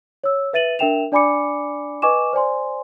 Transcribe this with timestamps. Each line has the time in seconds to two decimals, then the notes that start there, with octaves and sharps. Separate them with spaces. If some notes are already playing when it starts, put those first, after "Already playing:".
0.24 C#5 E6
0.53 B4 E5 A6 D#7 F#7
0.79 D4 A#4 E5 G5 E7 F7
1.12 D4 D5 G#5 B5 D6 C#7
2.02 B4 D#5 G#5 C#6 D6 E7
2.33 C5 D5 G#5 C6